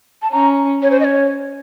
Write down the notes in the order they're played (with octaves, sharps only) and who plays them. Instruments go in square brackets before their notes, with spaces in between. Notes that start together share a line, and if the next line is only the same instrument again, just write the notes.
[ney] A5
[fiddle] C#4 [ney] A#5
[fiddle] C#4 [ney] C#5
[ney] C5
D#5
C#5